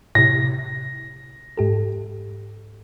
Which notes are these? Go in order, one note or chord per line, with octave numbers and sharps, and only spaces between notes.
A2 C3 A#6
G#2 G4 A4